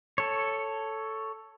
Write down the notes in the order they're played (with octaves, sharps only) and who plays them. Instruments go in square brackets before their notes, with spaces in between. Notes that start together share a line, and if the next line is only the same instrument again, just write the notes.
[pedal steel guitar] A4 C#5